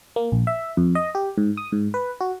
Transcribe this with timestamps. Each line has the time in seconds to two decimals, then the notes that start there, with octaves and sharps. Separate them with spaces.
0.16 A#3
0.32 A#1
0.47 E5
0.77 F2
0.95 D#5
1.15 G4
1.38 G#2
1.57 D#6
1.72 G#2
1.94 B4
2.21 F#4